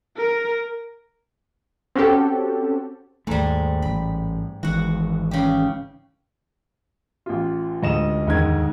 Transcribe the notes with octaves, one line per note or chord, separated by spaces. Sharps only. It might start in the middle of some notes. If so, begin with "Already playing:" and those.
A#4
C4 C#4 F#4 G4 A4
D#2 G#2 G3 A3
A1 B5
G#1 G#2 E3 F#4 F#5
C#3 G4
A1 F4
D2 G#3 D#5 E7
E2 G#2 D#3 G#6